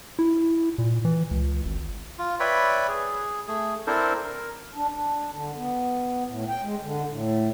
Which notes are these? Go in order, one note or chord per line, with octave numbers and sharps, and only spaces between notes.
E4
A#2
E3
C#2
G#1
F4
B4 C#5 D5 E5 G5 B5
G#4
A3 G#4
C4 D4 E4 A4 A#4 C5
A#4
D4
D4
D3
B3
A2
G5
G#3
D3
A2